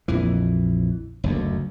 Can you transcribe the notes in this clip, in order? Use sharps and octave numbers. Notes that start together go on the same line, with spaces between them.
A#1 F2 E3
F#1 D2